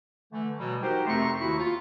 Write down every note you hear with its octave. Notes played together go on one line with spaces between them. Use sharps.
D3 E3 A3
B2 E3 F#3 G3
D#4 F#4 G4 A#4 C5
F2 C3 A3 A#5 C6 C#6
D#2 D#3 E4 F#4 B5 C#6
F4